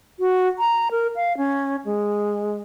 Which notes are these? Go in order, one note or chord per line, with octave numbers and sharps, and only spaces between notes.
F#4
A#5
A#4
F5
C#4
G#3